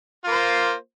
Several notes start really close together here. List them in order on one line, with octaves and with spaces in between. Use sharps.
F4 A#3 C5